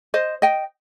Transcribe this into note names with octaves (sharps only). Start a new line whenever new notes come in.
C5 D#5
D#5 G5